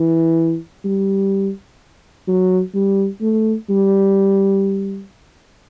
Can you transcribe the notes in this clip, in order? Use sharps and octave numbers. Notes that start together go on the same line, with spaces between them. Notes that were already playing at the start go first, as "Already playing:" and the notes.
Already playing: E3
G3
F#3
G3
A3
G3